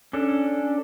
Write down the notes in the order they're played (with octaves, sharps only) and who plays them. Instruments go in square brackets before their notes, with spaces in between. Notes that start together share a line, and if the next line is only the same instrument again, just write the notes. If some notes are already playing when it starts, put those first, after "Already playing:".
[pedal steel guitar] C#4 D4 A4